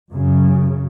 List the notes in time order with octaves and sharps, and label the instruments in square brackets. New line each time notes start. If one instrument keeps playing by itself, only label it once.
[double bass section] F#2 C#3